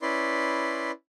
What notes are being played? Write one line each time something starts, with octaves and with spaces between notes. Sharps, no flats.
C#4 E4 B4 D5 C6